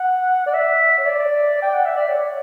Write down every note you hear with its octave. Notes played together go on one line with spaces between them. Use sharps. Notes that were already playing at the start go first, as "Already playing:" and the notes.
Already playing: F#5
D5
E5
C#5
D5
G5
F#5
E5
D5
C#5